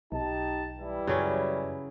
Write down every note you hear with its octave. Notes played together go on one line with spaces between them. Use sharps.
B1 D#4 G4 A5
E3 G3 E4
F#2 C#3 F#3 C#4